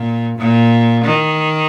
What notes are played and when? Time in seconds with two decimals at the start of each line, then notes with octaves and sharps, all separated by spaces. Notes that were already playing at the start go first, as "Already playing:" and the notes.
Already playing: A#2
0.38 A#2
1.05 D#3